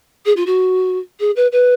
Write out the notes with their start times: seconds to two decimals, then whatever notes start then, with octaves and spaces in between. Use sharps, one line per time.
0.26 G#4
0.36 F4
0.47 F#4
1.20 G#4
1.36 B4
1.52 B4